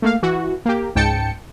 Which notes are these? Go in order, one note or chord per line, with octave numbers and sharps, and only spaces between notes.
A3 A#3 F5
E3 F#4
A#3 G4
C#2 G#2 G5 A5 C#7